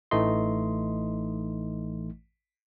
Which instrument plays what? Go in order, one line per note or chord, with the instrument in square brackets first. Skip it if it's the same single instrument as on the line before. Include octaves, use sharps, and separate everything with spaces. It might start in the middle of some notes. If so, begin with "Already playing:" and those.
[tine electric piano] A1 E3 A3 D#4 D#5 C6